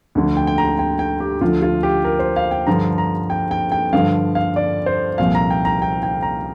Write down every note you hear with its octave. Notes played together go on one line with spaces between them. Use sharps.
D2 D3 F3
G5
G5
A#5
G5
G5
G4
D2 D3 F3 F4
F4
G4
A#4
C5
F5
G5
G2 D3 F3 A#5
A#5
G5
G5
G5
G2 D3 F3 F5
F5
D5
C5
C2 A#2 F3 F5
A#5
G5
A#5
G5
G5
A#5